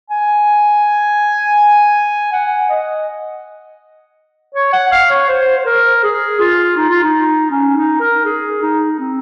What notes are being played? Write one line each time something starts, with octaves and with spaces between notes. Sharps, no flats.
G#5
F#5
D#5
C#5
F#5
F5
C#5
C5
C5
A#4
G#4
F4
D#4
F4
D#4
C#4
D#4
A#4
G#4
D#4
C4